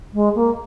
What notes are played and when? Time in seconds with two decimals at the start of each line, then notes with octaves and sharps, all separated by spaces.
0.14 G#3
0.35 A#3